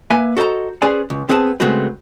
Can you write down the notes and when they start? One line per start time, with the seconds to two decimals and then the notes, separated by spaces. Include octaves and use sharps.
0.10 A#3 B4 E5 G#5
0.37 F#4 A4 C5 D#5 A#5
0.82 C#4 G#4 B4 C5 D5 G#5
1.10 C#2
1.29 B3 C4 G#4 B4 F#5 A5
1.60 C#3 G#3 A3 C4 F#4 B4